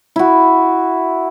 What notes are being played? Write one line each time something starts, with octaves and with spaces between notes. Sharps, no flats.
E4 F#4